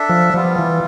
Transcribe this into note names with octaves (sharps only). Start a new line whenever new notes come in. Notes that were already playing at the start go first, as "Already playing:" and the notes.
Already playing: D4 A4 E5
F3
F3 G3 B3 F4
E3